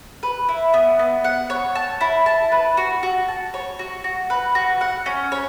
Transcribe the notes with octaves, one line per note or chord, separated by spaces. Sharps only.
B4
E4
B3
B3
F#5
C#5
A5
E4
A5
B4
F#4
F#4
A5
C#5
F#4
F#4
B4
F#4
F#5
C#4
C#5